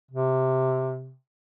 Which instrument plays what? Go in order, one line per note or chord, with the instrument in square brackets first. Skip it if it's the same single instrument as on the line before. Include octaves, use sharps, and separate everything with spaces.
[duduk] C3